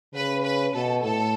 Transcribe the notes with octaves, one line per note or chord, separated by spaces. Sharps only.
C#3 B4
B4
B2 A4
A2 A4